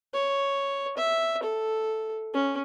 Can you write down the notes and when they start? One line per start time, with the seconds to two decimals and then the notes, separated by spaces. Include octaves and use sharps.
0.13 C#5
0.97 E5
1.43 A4
2.34 C#4